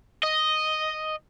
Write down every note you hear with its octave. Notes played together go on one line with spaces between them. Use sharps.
D#5